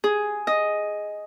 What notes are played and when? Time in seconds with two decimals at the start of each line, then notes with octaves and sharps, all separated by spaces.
0.04 G#4
0.47 D#5